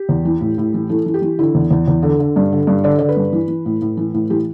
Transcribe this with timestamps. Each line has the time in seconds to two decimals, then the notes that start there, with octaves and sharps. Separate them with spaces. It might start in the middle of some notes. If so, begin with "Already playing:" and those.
Already playing: G4
0.09 E2
0.25 E3
0.41 A2
0.58 A2
0.74 E3
0.89 E3 A4
1.06 E3
1.14 G4
1.22 E3
1.39 D3 E4
1.55 E2
1.71 E2
1.88 E2
2.03 D3
2.19 D3
2.36 G2
2.52 D3
2.67 G2
2.84 D3 D5
2.99 D3 D5
3.09 B4
3.17 G2
3.32 E3
3.48 E3
3.66 A2
3.82 A2
3.97 E3
4.14 A2
4.30 E3 G4